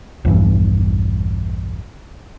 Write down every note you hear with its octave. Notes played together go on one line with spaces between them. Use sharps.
A#1 E2 G2 E3